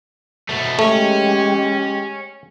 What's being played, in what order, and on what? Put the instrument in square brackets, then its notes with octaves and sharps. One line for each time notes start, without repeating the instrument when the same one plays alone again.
[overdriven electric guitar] B2 A3
[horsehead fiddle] G#3 G4 [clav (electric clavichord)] A3 [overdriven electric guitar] C#4